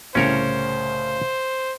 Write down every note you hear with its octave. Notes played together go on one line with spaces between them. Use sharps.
C2 A2 C#3 C#4 A#4 C5 C#5